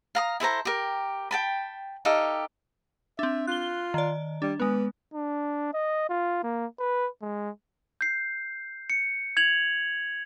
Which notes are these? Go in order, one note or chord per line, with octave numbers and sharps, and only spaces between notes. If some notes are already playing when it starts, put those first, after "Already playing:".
F5 A#5 D#6
E4 A4 C5 A#5
G4 A#4
G5 A5 B5
D#4 G4 A4 F5
C4 D4 E5
F4 F#6 G7
D#3 D5
G3 D4
G#3 B3 B4
D4
D#5
F4
A#3
B4
G#3
G6 C7
C#7
G#6 F7 F#7